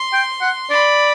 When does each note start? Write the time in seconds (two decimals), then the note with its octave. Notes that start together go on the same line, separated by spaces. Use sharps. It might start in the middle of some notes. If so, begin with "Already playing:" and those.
Already playing: C6
0.13 G5
0.41 F#5
0.70 D5 B5